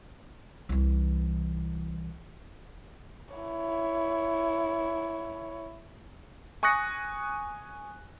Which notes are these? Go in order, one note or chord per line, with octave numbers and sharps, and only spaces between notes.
C2 E3
E4 C#5
G#5 C#6 D#6 F#6 A#6 C#7